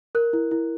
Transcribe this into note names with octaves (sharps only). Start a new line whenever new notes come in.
A#4 F#6
E4
E4